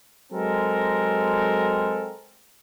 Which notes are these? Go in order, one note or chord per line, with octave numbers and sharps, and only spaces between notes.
F#3 G#3 C4 A4 A#4